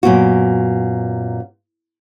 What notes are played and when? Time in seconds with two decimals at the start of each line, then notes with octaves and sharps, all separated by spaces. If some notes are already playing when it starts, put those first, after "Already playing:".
0.03 F#2 A#2 B3 F#4